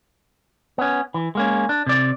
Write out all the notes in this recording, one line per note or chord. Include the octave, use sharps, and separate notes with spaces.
B3 C#4
E3
G#3 A#3 C#4
D4
C3 D5